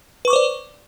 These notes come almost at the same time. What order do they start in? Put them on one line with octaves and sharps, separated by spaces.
B4 C#6 D6 C5 D5